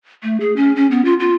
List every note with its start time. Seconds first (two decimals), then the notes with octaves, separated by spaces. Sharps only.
0.23 A3
0.40 G#4
0.56 C#4
0.76 C#4
0.91 B3
1.05 F4
1.20 F4